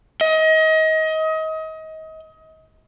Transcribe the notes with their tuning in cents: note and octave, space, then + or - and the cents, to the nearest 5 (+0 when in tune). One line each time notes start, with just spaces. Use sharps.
D#5 +30